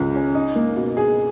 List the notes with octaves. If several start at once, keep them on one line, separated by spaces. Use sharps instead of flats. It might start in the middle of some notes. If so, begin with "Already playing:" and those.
Already playing: C#2 C#3
C#4
D#4
A#3
B2
G#4